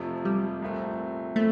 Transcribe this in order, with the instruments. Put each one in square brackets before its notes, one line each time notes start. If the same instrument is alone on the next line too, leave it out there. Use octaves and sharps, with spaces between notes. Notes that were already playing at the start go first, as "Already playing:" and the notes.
Already playing: [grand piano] F2 C3 F3 A3
[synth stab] G3
[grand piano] C2 A#2 A3 C4
[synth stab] A3 [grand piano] C4 E4